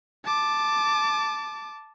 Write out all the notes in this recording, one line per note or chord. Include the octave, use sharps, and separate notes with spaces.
A5 D6